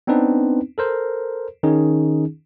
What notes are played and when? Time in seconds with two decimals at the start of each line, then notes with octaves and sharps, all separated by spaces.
0.07 B3 C4 D4 D#4 B4
0.78 A4 A#4 C5
1.63 D#3 C#4 D#4 G#4